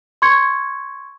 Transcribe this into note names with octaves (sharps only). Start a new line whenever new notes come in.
C6 C#6 G#6 C#7